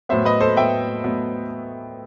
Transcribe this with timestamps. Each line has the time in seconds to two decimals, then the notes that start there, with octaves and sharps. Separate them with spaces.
0.09 A2 F#3 B3 C5 E5
0.25 B4 D#5
0.41 A4 C5
0.56 A2 F#3 B3 E5 G5
1.04 A2 F#3 B3